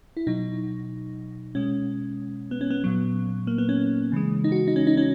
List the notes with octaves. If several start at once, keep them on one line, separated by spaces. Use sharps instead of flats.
E4
B2 F#3 D#4
B2 G#3 C#4
B3
C#4
B3
A#2 F#3
A#3
B3
C#4
C#3 E3 G#3
D#4
F#4
D#4
C#4
D#4
C#4